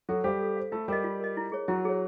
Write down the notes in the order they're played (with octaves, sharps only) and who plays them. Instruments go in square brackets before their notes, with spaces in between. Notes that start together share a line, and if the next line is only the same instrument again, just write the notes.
[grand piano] F#3 F#4 [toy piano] A4
[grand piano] G3 G4 [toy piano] C5 F5
[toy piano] A4
C5 F5
[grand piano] A3 A4 [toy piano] F4
[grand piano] G3 G4 [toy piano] A#4 D#5
[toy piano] F4
A#4 D#5
E4
G#4 C#5
[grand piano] F#3 F#4 [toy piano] E4
[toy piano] G#4 C#5